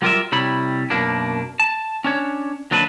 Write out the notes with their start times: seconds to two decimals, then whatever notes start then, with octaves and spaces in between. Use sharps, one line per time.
0.02 F#3 G3 F4 A#4 D5 E5
0.32 C3 G3 E4 C#5 B5
0.90 F#2 B2 A#3 D4
1.60 A5
2.04 C#4 D4 C#5
2.71 D#2 F#3 D4 B4 A5